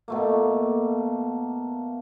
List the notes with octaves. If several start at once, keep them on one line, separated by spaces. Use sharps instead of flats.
B2 A3 A#3